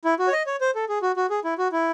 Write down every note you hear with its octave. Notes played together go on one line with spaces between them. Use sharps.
E4
F#4
C#5
D#5
C#5
C5
A4
G#4
F#4
F#4
G#4
E4
F#4
E4